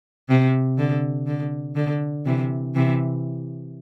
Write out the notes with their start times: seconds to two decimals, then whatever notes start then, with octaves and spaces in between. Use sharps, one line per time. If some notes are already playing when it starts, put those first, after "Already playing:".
0.29 C3
0.78 D3
1.27 D3
1.76 D3
2.26 C3 E3
2.74 C3 E3